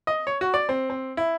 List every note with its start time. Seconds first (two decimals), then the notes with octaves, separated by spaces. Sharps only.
0.07 D#5
0.27 C#5
0.41 F#4
0.54 D5
0.69 C4
0.90 C4
1.17 E4